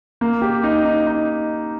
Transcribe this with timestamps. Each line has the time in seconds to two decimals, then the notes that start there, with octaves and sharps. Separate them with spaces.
0.21 A#3
0.42 G4
0.63 D#4
0.85 D#4
1.07 D#4